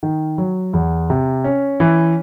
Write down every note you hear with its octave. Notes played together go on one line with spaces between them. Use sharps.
D#3
F#3
E2
C3
C#4
E3